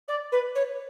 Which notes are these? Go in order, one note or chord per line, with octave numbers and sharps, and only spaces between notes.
D5
B4
C#5